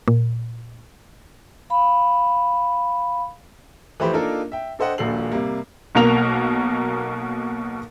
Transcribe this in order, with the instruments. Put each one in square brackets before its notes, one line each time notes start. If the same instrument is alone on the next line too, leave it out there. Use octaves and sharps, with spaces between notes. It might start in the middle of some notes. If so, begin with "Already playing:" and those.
[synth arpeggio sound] A#2
[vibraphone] F5 B5
[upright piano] E3 F3 A3 G4 C5 B5
A#3 D4 D#4 F4 A4 A#4
E5 G5
D4 A4 C5 D#5 F#5 G5
D#1 A#1 F#4 A4 C7 F#7
C3 G3 A#3
[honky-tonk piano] B1 B2 A#3 A#4 F7